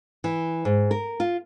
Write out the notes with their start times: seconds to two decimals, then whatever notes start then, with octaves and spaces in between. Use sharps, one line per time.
0.24 E3
0.65 G#2
0.91 A#4
1.20 F4